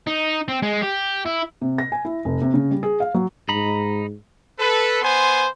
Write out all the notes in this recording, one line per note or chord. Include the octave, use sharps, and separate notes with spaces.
D#4
C4
G#3
G4
E4
C3
A#6
G#5
E4
F1
C3
C#3
G3
G#4
F5
F#3
G#2 D#4 A#5 B5
A4 B4
B3 C5 G#5 C6